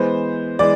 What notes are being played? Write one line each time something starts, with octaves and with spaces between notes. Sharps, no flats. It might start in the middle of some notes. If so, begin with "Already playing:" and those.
Already playing: E3 G#3 B3 C5
E3 G#3 D5